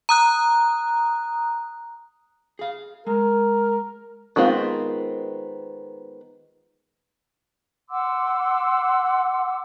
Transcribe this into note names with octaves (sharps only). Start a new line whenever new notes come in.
A#5 D#6 F#6
G#4 F5
G#3 A#4
D#3 G#3 B3 C4 F4
F#5 C6 D6 E6